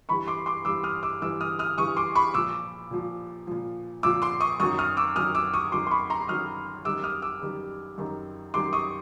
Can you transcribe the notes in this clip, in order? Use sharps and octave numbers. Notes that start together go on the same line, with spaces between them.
G2 E3 G3 B5 C#6
C6 D6
C6 D6
G2 E3 G3 D6 E6
D#6 F6
D6 E6
G2 E3 G3 D6 E6
D#6 F6
D#6 F6
G2 E3 G3 C#6 D#6
C6 D6
B5 C#6
A#2 F3 D6 E6
A#2 F3
A#2 F3
A#2 F3 D6 E6
C6 D6
C#6 D#6
F#2 D#3 F#3 C#6 D#6
D#6 F6
D6 E6
F#2 D#3 F#3 D#6 F6
D6 E6
C#6 D#6
F#2 D#3 F#3 C6 D6
C6
B5 C#6
A#5 C6
F#2 D#3 F#3 D#6 F6
F#2 D#3 G3 D6 E6
D#6 F6
D6 E6
F#2 D#3 G3
F#2 D#3 G3
F#2 D#3 G3 C6 D6
C#6 D#6